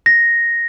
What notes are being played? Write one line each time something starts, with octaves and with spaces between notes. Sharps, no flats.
A#6